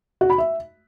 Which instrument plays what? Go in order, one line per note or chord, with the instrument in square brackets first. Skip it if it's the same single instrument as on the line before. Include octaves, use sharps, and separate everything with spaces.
[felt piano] F#4
B5
E5